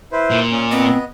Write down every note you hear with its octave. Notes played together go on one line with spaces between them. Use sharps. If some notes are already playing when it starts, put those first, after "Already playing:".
E4 B4 C5
A#2
C#4
B3 C4 D#5